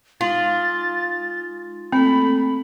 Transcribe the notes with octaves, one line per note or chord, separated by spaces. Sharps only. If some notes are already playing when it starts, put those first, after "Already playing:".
G#3 D#4 F4 A6
A3 A#3 C4 A4 B5